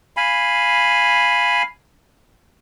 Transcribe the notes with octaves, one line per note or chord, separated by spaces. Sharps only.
F5 G#5 B5